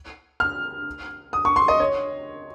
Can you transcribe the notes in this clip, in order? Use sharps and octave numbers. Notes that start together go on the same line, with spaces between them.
F6
D#6
C#6
C6
D#5
C#5